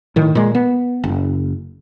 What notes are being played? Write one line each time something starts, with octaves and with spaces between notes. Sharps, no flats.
A2 D#3
A#2 G#3
B3
F#1